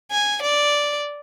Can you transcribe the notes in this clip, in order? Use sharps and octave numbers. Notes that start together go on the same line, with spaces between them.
G#5
D5